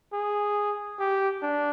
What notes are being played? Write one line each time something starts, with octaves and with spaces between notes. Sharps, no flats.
G#4
G4
D4